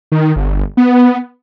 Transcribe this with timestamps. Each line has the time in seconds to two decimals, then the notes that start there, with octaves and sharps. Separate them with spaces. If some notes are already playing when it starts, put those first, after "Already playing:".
0.12 D#3
0.36 G1
0.77 B3